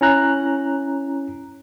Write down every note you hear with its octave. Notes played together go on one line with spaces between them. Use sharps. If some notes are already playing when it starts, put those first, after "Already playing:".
C#4 E4 A#5 F#6